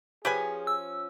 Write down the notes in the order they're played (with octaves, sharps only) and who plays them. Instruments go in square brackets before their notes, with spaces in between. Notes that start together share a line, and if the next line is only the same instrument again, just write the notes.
[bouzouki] F3 C#4 [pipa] G4 B4 G#5 [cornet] G#4
[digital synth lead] E6